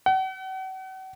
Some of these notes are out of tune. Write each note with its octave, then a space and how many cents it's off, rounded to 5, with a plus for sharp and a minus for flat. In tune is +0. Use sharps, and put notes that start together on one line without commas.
F#5 +40